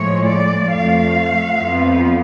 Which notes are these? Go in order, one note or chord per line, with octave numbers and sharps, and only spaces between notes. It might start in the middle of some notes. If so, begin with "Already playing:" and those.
Already playing: A2 F3 G#3 C#5
D5
F2 F3 A3 F5
F2 F3 B3